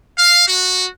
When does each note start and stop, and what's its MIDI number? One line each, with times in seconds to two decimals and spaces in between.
0.18 0.48 77
0.48 0.86 66